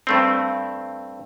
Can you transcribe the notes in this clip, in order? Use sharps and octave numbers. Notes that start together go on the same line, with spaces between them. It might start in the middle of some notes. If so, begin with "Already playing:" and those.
G2 A3 C4